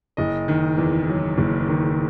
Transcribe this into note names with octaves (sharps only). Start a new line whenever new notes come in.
F#1 D#5
D#3
E2
F#3
F#1
D#3